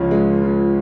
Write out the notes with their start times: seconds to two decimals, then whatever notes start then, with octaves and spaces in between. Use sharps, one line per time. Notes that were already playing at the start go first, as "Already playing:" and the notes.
Already playing: C#2 C#3 F3 C#4
0.11 G#3
0.43 F3